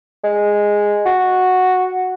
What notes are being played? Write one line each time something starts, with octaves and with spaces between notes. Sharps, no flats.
G#3
F#4